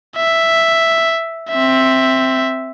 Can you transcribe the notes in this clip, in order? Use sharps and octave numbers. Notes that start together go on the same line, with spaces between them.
E5
C4 E5